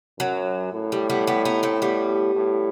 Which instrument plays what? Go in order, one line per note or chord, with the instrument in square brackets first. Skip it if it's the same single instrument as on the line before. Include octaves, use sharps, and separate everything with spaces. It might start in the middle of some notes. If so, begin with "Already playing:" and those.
[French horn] F#2 [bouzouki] F#3
[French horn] A2
[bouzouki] G3
G3 B3
G3 B3
B3 D#4
A3 C4
G3 B3
[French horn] A2